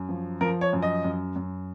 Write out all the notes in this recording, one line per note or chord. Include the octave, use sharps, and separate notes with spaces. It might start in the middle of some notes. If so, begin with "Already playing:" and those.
Already playing: F#2
F3
F3 A#4
C#5
F#2
D#5
F#2
F#2